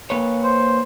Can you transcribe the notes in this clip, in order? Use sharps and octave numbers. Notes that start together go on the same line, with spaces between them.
A#3 B4 C#5
C5